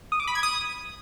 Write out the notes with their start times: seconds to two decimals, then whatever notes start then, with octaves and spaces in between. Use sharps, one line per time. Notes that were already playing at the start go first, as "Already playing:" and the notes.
0.12 D#6
0.20 D6
0.27 B5
0.35 G#6
0.43 D#6